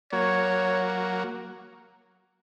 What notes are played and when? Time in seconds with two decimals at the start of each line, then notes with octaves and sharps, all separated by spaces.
0.13 F#3 A#3 C#5